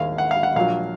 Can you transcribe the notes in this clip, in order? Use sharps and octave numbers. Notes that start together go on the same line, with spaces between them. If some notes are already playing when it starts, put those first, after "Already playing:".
Already playing: D#2 D#3 G#3 F5
F#5
F5
F#5
A#1 A#2 F#3 F5